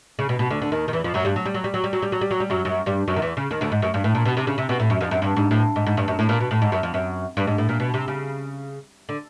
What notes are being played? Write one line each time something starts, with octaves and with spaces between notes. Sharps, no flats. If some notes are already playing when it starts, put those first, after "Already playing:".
C#3
B2
B2
D2 D3
D3
D#2 D#3
D#3
E2 E3
F2 F3
F#2 F#3
G2 G3
F#3
G3
F#3
G3
F#3
G3
F#3
G3
F#3
G3
F#3
G3
F#2 F#3
F#2 F#3
G2 G3
F#2 F#3
D#3
E2 E3
C#3
D#2 D#3
D2 D3
G#2
F#2
G2
A2
A#2
B2
C3
C#3
C3
B2
A2
F#2
F2
F#2
G2
G#2
A2
G#2
G#2
G2
F#2
A2
A#2
B2
A2
G#2
F#2
F2
F#2
G2
G#2
A2
A#2
B2
C3
C#3
D3